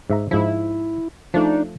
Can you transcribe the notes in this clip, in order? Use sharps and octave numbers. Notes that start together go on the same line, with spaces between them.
G#2 E5 A#5
G#2 F3 E4
F3 A3 D4 D#4